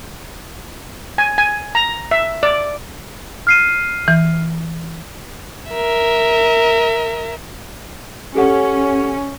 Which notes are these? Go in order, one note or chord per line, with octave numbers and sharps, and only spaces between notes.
G#5
G#5
A#5
E5
D5
F6 C7 D#7
E3
A#4 E5
C#4 G4 A4 F#5